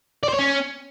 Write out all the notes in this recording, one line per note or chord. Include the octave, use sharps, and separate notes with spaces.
D5
C5
C#5
C#4